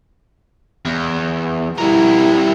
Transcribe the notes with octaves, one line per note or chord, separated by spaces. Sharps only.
E2
G3 E4 A#4